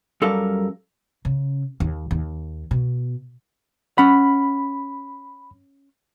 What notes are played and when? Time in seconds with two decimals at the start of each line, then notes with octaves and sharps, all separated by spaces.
0.22 F#2 G3 A4 A#4 F5
1.25 C#3
1.80 D#2
2.11 D#2
2.71 B2
3.98 C#4 F#5 B5